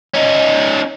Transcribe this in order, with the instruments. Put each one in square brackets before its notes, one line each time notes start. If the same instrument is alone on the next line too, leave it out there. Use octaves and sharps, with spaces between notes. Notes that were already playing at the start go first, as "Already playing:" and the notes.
[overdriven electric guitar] C#4 D#4